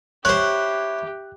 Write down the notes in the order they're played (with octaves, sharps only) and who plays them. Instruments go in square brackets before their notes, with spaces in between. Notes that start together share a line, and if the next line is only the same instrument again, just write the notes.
[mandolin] E4 [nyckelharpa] G4 [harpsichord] C5 C#5 [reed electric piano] F#6